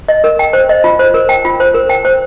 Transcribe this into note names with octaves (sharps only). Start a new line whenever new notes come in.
D#5
A#4
G5
C5
D#5
F4
C5
A#4
G5
F4
C5
A#4
G5
C5